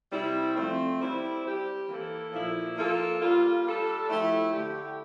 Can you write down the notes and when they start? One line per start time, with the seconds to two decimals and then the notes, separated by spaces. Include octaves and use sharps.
0.11 C3 G3 C4 E4
0.56 F3 A3 C4
0.99 G3 C4 E4
1.44 G3 C4 G4
1.88 E3 A#3 E4 A4
2.32 A#2 F3 A#3 E4
2.76 F3 A#3 F4 A4
3.20 G3 A#3 F4
3.65 G3 D4 A4
4.08 F3 A3 E4 G4
4.52 D3 A3 E4 G4